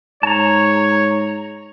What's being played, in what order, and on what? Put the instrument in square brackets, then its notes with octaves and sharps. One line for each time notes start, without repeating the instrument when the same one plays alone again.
[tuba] G#2 [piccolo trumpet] C#5 [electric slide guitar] A5 A#5